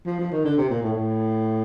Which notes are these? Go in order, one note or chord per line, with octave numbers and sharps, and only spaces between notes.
F3
F3
D#3
D3
C3
A#2
A2
A2